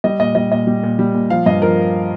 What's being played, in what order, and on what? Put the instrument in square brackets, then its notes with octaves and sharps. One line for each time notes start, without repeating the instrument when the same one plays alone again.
[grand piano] G3 D#5
A#2 D#5
G3 D#5
A#2 D#5
G3
A#2
G3
A#2
F3 F5
G2 D#5
F3 A#4